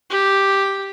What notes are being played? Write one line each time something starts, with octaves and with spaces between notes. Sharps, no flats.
G4